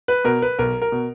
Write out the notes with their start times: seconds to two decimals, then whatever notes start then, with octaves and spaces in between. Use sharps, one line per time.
0.08 B4
0.25 B2 A#4
0.42 B4
0.59 B1 A#4
0.82 A#4
0.92 B2